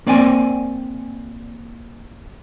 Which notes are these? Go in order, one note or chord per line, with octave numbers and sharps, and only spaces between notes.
A#3 C4 D5 G5 G#5